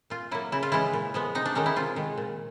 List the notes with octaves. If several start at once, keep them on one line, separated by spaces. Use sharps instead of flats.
A#2 F4
F#3 A#3 E4
C#3 E4
F4
E3 G#3 C#4 E4
A#2
F3 G#3 B3
C3 D#4
D4
D#3 G#3 C#4 D#4
E4
C3 F4
D#3 G#3
A#2